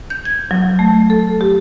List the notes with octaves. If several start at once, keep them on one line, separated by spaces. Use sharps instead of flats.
G6
G#6
F#3
A3
A4
G4